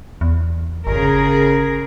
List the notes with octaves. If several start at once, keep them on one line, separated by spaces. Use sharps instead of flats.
E2
G1 C#3 G#4 A#4